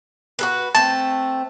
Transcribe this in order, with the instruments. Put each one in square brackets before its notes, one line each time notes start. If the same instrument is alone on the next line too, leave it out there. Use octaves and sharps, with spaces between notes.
[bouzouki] F#4 A4 B4
[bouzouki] A3 C4 [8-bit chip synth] A5